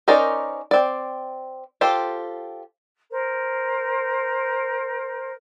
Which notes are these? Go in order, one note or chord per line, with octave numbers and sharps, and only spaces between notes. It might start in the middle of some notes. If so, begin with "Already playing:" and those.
C#4 D#4 A#4 C5 D5
C4 D5
F4 G4 A4 C5
A#4 C5